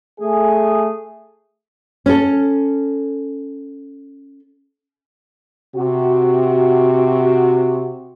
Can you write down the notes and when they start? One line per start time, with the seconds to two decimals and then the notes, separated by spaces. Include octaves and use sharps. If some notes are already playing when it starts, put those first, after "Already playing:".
0.20 A3 G#4
2.06 C#4 A4
5.75 C3 F#4